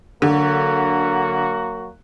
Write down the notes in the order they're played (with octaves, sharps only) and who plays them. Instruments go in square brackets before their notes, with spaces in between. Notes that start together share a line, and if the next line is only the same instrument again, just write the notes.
[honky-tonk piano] D3 [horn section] F#3 A#3 F#4